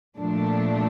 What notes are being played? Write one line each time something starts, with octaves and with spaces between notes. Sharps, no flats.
A#2 F3 A3 D4